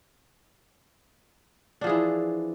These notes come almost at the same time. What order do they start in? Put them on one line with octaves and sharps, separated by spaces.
D4 F3 G#4 E3